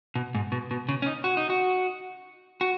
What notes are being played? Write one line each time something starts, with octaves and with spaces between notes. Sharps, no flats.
B2
G#2
B2
B2
C#3
C#4
D#4
F#4
D#4
F#4
F#4